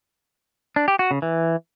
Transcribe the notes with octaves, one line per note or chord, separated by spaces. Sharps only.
D4
G4
F#4
C#3
E3